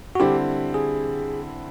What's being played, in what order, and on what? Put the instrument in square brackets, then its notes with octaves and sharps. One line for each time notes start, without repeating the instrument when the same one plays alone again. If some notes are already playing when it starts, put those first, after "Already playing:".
[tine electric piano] F#4
[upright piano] D3 G3 C4 E4 [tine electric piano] G4
[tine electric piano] G#4